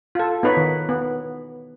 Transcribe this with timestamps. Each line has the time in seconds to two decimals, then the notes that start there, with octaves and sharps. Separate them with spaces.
0.15 F4 A4
0.43 B3 D#4 B4 C#5
0.57 D#3
0.89 B3